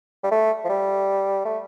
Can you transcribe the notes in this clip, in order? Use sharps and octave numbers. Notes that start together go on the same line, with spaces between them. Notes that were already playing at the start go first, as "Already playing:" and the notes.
G3
A3
F3
G3
A3